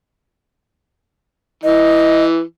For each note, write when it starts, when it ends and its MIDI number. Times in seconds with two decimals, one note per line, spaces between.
1.63 2.42 52
1.63 2.24 75